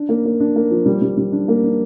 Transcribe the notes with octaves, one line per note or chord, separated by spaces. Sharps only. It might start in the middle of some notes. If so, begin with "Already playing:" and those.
Already playing: D4
A#3
A#3
D4
A#3
F3
G3
G3
G3
D4
A#3
D4